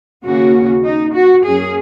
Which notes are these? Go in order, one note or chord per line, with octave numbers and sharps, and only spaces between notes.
D#2 C#3 A#3 C#4 F#4
D#4
F#4
F#2 F#3 A#3 C#4 G#4